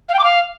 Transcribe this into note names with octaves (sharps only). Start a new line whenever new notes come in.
F5
G5
D6
F5